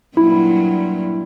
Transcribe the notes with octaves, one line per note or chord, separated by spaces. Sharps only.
G2 A#2 F#3 E4